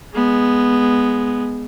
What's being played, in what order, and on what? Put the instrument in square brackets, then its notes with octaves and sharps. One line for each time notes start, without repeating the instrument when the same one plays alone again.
[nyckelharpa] G#3 B3